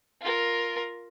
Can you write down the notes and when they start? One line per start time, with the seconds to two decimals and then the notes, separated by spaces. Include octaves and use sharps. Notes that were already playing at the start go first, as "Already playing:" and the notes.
0.22 F4 A#4